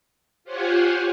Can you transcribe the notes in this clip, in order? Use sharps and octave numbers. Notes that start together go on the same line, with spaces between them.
F4 G4 C5 C#5 F#5 G#5